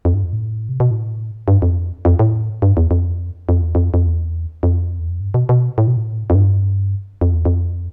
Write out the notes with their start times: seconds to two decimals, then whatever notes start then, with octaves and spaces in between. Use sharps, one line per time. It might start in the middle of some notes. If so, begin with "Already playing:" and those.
0.05 F2
0.14 G2
0.24 F2
0.33 A2
0.69 C3
0.80 B2
0.91 A2
1.48 G2
1.62 F2
2.05 F2
2.19 A2
2.62 G2
2.77 E2
2.91 F2
3.49 F2
3.62 E2
3.75 F2
3.94 F2
4.06 E2
4.63 F2
4.99 E2
5.09 F2
5.20 G2
5.34 B2
5.49 B2
5.78 A2
5.87 B2
5.97 A2
6.30 F2
6.35 G2
7.21 F2
7.34 E2
7.45 F2